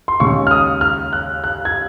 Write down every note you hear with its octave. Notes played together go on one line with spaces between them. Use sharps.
C6
D#2 C#3 G#3 C#6
F6
D#6
F6
F#6
F#6
G#6